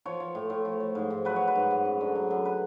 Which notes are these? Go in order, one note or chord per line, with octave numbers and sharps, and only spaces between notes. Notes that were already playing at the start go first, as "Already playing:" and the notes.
F3 C#5
F3
A2
A2
F3
F3
G#2
G#2
F#3 B4
F#3 C#5
B4
G#2
G#2
F#2
D3
F#3
F#2
B4